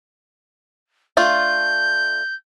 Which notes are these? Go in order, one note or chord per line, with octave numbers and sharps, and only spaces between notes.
A3 D4 F4 G6